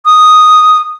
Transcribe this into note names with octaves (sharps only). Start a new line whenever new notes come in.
D#6